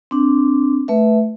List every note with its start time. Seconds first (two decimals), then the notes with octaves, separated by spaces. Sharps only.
0.11 C4 D4
0.88 A3 B4 E5